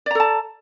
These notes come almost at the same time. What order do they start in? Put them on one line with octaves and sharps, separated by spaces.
D5 A#5 A4 A5